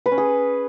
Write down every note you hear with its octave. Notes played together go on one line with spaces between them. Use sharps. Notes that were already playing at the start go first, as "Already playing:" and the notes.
B4
C#4
G#4